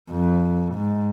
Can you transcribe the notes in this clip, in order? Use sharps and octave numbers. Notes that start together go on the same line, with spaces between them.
F2
G#2